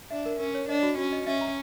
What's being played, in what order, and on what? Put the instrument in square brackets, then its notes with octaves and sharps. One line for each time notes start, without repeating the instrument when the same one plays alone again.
[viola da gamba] D4 [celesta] E5
[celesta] A#4
[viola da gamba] C#4 [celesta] A#4
[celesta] C#5
[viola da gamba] D4 [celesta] D#5
[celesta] F#4
[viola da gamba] C#4 [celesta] F#4
[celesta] D#5
[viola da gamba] C#4 [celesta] E5
[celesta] A#5